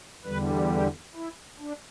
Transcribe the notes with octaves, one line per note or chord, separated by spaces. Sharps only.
E2 D3 G3 B4
G4
E4
D4